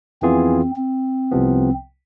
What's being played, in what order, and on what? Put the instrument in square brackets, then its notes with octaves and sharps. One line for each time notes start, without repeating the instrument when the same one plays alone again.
[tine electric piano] F2 E3 B3 F4 G#4 [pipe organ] C4
[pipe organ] C4
[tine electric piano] C2 C3 F3 B3